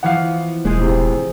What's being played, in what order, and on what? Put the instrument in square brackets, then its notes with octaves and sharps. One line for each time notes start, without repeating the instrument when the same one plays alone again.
[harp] E3 F3 B3 [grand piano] F5 F#5
[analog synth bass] E1 [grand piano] G#3 [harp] G#4 C5
[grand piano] A2 C3